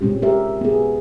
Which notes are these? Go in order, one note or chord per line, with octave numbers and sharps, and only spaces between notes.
A#2 G#3 C4 C#4 G4
G4 A#4 E5
B3 G#4